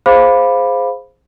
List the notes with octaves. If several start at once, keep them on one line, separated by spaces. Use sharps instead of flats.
G#4 C5 F5 B5 D6